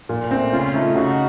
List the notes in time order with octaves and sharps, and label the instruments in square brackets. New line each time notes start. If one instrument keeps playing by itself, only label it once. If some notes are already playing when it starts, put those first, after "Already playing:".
[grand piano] A#2
A3 C4
[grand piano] C#3 [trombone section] C#4 F4
[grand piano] A3 D#4
[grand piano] C#3 [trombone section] D#4 F#4